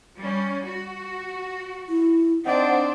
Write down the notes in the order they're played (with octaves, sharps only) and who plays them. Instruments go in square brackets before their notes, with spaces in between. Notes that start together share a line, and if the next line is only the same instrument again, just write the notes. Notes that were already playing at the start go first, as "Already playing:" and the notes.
[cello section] G3 C#4
F#4
[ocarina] E4
[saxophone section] C4 D#4 D5 [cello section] D4 C5 [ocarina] F#5